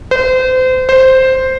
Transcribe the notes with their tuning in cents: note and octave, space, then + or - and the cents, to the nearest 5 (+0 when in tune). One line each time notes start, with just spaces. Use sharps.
C5 -30
C5 +0